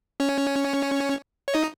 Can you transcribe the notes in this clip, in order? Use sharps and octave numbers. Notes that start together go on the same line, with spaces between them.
C#4 C#5
C#5
D#4 D#5